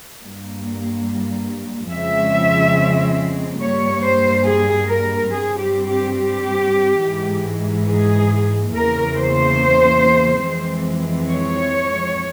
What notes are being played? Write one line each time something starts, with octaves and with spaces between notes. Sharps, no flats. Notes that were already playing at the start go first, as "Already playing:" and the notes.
G2 G3 A#3
F2 C#3 F3 G#3 C4 E5
G2 G3 A#3 C#5
C5
G#4
A#4
G2 G3 C4 G#4
G4
G4
G4
G#2 E3 G#3
G#4
E2 C#3 E3 A#3 A#4
C5
F2 E3 G#3 C4
C#5